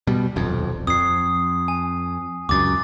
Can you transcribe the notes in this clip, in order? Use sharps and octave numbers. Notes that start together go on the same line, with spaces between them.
B2 G3
D#1 B1 F2
F2 D#6 C7
G#5
C#2 F#2 D6 A6